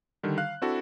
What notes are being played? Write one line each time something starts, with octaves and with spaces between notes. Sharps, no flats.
D3 D#3 G3
F5 F#6
C4 D4 E4 F#4 A4